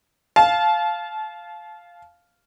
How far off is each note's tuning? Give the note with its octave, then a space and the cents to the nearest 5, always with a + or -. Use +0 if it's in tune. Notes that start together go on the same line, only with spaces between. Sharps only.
F5 -5 A5 -30